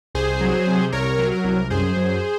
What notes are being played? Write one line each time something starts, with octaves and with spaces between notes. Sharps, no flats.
C2 G#4 C5
F#3
C3
C2 A#4 C#5
F#3
A#4
C2
F#2 G#4 C5
F#2